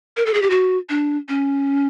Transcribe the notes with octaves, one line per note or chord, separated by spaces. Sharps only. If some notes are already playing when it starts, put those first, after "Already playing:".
A#4
A4
G#4
G4
F#4
D4
C#4